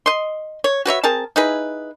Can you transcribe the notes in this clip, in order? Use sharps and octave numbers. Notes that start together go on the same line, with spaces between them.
D#5 C6
C#5
F#4 B4 C#5 E5
C4 G#4 A#4 A5
D#4 E4 G#4 B4